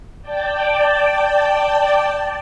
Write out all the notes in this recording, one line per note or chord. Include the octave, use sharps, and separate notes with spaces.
D5 G5 A5